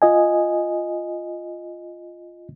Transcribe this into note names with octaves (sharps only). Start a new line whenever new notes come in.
F4 D#5 G#5